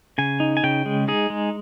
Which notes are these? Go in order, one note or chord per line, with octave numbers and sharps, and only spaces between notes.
C#3 G#5
D#4
G#5
C#3 G5
G#3
D#4 G#4
G#3